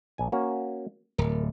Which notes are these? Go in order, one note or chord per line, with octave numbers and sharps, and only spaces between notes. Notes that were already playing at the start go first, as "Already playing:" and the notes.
A#1 G#5
A#3 C#4 F#4
D1 A#4